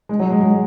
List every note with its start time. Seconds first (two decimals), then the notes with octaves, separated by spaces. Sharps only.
0.09 G#3
0.20 F#3
0.30 G#3
0.41 G#3